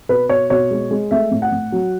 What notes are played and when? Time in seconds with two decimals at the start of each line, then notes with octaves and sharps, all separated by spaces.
0.09 B2 B4
0.29 B2 C#5
0.50 B2 C#5
0.71 G#3
0.91 G#3
1.11 A3 E5
1.31 A2
1.42 F#5
1.52 A2
1.72 F#3